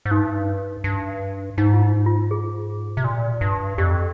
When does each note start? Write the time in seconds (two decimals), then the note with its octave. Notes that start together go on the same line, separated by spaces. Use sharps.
0.06 G#2
0.11 G2 D#4
0.84 G2
1.58 G#2 D#4
1.74 F4
1.82 D#4
2.06 F4
2.31 G#4
2.97 C3
3.04 A#2
3.41 G2
3.78 F2 G4